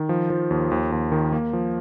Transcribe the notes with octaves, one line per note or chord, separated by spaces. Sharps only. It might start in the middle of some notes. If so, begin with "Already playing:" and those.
Already playing: D#3
F3
F3
D#2
D#2
D#2
D#3
A#3
F3